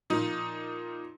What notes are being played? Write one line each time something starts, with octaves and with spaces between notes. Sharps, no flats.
A#2 F3 D#4